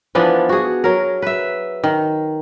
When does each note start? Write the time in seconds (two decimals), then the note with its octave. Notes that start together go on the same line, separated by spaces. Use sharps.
0.15 E3 F3 B3 D4
0.49 F#4 G#4
0.84 F#3 A#4
1.22 B4 E5
1.84 D#3